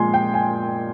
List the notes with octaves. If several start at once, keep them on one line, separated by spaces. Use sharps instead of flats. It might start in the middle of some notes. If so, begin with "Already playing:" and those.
Already playing: A#2 F3 G#3 G#5 C6
G5
G#5